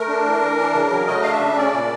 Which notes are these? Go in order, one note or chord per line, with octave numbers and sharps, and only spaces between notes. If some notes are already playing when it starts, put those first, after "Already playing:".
Already playing: A3 A#4
D4
E3
E3
D4
C#3
F#3
A3 D#5
D4 F5
E5
C#3
C#4 D5
A#2